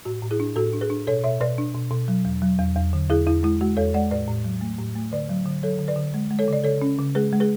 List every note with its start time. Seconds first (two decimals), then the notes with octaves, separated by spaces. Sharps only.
0.05 A2 F#4
0.22 A2
0.31 E4 G#4
0.40 D4
0.56 A2 F#4 A4
0.73 D4
0.81 G#4 B4
0.90 D4
1.07 B2 A4 C#5
1.23 B2 C#5 E5
1.41 B2 B4 D5
1.58 D4
1.75 B2
1.91 B2
2.08 F#3
2.25 E2
2.42 F#3
2.59 E2
2.76 E2
2.93 D3
3.10 E2 E4 G#4
3.27 E2 E4
3.43 G#3 E4
3.61 G#3 F#4
3.77 E2 A4 C#5
3.94 G#3 D5 F#5
4.11 A2 B4 D5
4.28 A2
4.45 F#3
4.61 A3
4.79 A2
4.96 A3
5.12 D3 B4 D5
5.29 F#3
5.45 D3
5.63 F#3 A4 C#5
5.79 D3
5.88 B4 D5
5.96 D3
6.14 G#3
6.31 G#3
6.39 A4 C#5
6.48 C#3 D5
6.64 C#3 A4 C#5
6.82 C#4
6.99 C#3
7.15 G#3 G#4 B4
7.32 G#3
7.40 G#4 B4